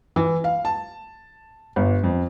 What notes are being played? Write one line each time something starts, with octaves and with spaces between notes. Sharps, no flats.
E3
F5
A5
G1
F2